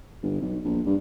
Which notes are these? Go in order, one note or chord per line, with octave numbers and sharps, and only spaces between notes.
G1
B1
A#1
G2